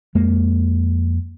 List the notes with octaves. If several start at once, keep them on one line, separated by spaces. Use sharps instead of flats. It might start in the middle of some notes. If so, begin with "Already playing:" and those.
F2 G#3 A#3